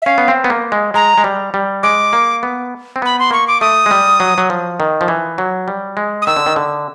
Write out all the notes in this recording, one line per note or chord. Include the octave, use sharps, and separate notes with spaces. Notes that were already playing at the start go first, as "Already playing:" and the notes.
E5
C#4 F5
B3
C4
B3
A#3
G#3
G#3 A#5
G#3
G3
G3
G#3 D6
A#3
B3
C4
B3 B5
C6
A#3 C#6
D6
A3 D#6
G#3
G3
F#3
F#3
F3
D#3
F3
E3
F#3
G3
G#3
D#6
D#3 E6
D3
D#3
D3